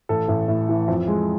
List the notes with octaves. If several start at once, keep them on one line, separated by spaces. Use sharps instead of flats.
A1 A4
A1
A2
E3
F2
G#3